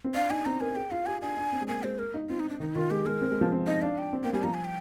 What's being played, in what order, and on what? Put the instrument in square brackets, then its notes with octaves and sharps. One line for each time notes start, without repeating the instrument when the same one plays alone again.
[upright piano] C4
[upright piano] D4 [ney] F5
[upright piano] D#4 [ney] G#5
[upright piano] C4 [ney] A#5
[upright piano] A#4 [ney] G#5
[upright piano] G#4 [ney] G5
[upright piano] F4 [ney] F5
[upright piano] G4 [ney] G#5
[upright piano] D4 [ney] G#5
[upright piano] D4
C4
G#3
[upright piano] A#3 [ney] G#5
[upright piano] G#3 [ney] C5
[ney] A#4
[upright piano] D#4
[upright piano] C4 [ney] F4
[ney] D#4
D4
[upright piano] D#3 [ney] D#4
[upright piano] D#3 [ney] F4
[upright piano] G#3 [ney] G4
[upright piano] G#3 [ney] A#4
[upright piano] C4
G#3
F3
C4
[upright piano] D#4 [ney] D#5
[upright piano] D4 [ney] F5
[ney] G5
[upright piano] C4
[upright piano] A#3 [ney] G5
[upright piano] G3 [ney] G#5
[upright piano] F3 [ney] A#5
[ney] G#5
G5